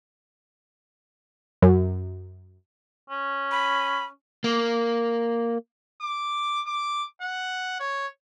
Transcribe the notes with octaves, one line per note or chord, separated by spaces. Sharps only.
F#2
C#4
B5
A#3
D6
D6
F#5
C#5